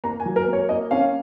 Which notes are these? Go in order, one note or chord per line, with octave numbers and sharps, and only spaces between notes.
A#3 A#5
G#5
F#3
A#4
A#3
C#5
A#3 D#5
C#4 F5